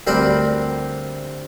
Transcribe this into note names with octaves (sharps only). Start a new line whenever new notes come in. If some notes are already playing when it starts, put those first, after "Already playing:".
D2 G3 C4 A#4 G5 B5